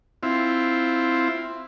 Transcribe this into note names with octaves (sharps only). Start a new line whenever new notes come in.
C4 E4 F4